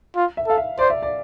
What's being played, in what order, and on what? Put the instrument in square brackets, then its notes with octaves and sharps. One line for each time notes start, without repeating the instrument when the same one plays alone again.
[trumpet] F4
[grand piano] E5
[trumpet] A4 [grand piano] F5
[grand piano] E5
[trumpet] C5 [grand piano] D5
[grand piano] E5
D5